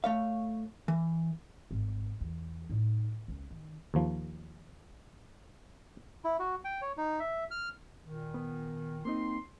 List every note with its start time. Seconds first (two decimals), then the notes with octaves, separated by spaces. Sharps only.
0.04 A3 C#5 F5
0.88 E3
1.71 G#1
2.21 E2
2.70 A2 D#4
3.28 C#2
3.51 D#3
3.94 D#2 F3
6.24 E4
6.39 F#4
6.64 G5
6.82 C#5
6.97 D#4
7.20 E5
7.51 F6
8.04 A#2 D#3
8.34 B3
9.05 A#3 C4 D#4 C6